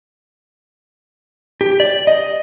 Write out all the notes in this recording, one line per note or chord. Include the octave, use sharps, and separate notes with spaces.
G4
D5
D#5